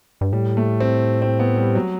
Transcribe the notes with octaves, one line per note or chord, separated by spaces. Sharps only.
G2
A2 G3
A3
C4
C4
B3
G3
F#3